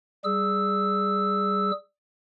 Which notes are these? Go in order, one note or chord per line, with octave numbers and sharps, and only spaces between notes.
G3 G#4 E6